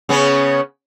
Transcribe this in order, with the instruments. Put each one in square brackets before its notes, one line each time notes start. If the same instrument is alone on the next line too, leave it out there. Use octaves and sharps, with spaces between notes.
[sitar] C#3 B3 C#4